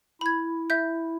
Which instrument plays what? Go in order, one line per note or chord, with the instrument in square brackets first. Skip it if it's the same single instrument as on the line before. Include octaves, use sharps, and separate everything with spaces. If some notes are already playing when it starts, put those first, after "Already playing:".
[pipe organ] E4 [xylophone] B5 G#6
[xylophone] E5 G6